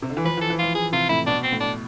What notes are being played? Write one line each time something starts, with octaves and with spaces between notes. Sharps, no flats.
C3
D3
E3
F3 B4
E3
A4
E3
F3 F4
E3 G#4
C3 F4
A2 E4
B2 D4
C4
A2
D4